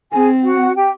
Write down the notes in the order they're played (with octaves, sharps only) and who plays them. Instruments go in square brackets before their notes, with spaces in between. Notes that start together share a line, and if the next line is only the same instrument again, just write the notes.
[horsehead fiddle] C4 [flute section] G#4 G#5
[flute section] F#4 F#5
G4 G5